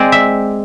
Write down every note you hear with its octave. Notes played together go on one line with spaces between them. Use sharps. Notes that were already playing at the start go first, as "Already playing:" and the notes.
Already playing: G#3 C4 D5
E5